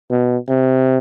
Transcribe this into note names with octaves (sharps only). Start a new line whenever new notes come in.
B2
C3